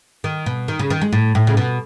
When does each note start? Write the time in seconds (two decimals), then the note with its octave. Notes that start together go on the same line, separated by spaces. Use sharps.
0.24 D#3
0.46 B2
0.68 D#3
0.79 C#3
0.90 D#3
1.02 G#3
1.13 A2
1.35 A2
1.47 C#3
1.57 B2